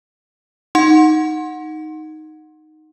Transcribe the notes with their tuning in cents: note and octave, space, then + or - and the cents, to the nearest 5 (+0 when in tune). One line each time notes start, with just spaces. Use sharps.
D#4 +0 F#5 -15 C6 +25